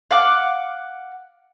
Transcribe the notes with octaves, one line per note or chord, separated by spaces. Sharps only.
F5 F#5 D6